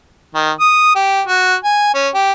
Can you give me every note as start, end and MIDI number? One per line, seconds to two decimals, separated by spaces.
0.35 0.51 51
0.60 0.92 87
0.95 1.21 67
1.27 1.55 66
1.64 1.94 80
1.94 2.09 61
2.15 2.33 67